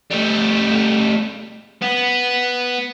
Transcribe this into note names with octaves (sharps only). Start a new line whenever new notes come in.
G3 A3
B3